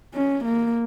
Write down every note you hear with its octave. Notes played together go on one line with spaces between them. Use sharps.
C#4
A#3